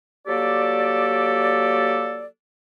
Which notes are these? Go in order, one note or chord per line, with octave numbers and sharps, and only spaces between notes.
F#3 A#3 G4 A4 D5